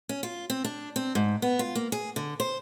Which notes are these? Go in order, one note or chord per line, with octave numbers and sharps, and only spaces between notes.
C#4
F4
C4
D4
C4
G#2
B3
F4
A#3
G#4
D3
C5